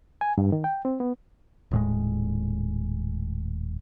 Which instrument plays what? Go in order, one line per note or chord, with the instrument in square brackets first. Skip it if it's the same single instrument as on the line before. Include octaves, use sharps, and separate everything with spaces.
[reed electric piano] G#5
G2
D#3
G5
C4
B3
[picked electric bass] D#1 A2 G#3